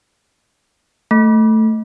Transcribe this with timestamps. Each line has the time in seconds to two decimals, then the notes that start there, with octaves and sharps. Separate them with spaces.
1.11 A3